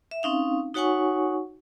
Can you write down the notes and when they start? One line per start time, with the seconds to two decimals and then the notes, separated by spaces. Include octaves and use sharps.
0.11 E5
0.23 C4 C#4 D#4 F5
0.74 D#4 F#4 C#5 F#5 G#5 C#6